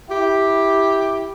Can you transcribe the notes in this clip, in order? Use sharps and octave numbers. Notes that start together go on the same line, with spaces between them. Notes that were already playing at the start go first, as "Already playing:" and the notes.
E4 G4